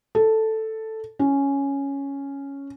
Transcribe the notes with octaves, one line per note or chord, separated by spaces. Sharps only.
A4
C#4